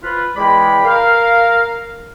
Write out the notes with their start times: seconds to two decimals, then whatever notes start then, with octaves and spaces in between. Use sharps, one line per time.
0.03 F4 B4
0.36 E2 G#3 D5 G5 B5
0.85 A#4 F5